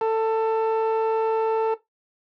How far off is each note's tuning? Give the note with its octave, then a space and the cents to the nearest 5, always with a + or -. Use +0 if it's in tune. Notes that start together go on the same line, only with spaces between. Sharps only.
A4 +20